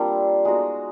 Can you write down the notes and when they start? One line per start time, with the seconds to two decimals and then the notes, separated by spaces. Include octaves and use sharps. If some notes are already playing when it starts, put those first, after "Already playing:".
Already playing: G3 A#3 C4 D4 F4 G4
0.45 G#3 B3 D#4 F#4